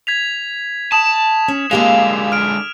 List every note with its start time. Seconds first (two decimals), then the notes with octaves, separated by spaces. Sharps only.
0.07 G#6 B6 F7
0.92 A5 D#6 E7
1.48 C#4
1.71 D3 G#3 A#3 G4 F5 F7
2.32 F6 D7